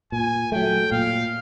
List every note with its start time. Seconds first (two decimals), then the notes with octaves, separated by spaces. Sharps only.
0.12 A#2 G#5
0.52 F#3 A3 G5
0.91 A#2 F5